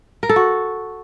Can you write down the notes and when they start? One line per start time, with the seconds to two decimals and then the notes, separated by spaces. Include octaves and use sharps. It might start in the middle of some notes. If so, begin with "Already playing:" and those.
0.23 A#4
0.29 A4
0.36 F#4